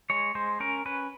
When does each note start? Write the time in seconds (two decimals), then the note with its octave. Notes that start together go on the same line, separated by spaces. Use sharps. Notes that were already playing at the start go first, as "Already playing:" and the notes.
0.10 G#3 C#5
0.35 G#3 C5
0.60 C#4 A#4
0.86 C#4 B4